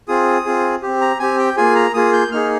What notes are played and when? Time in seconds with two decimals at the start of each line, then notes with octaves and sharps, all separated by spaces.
0.08 C4 F4 G#4 D#6
0.45 C4 F4 G#4
0.83 C4 G4
1.01 A#5
1.19 C4 G4 G#5
1.39 G5
1.57 A#3 F4 G#4 G#5
1.75 A#5
1.94 A#3 F4 G#4 D#6
2.13 G6
2.32 A#3 D#4 G#4 F6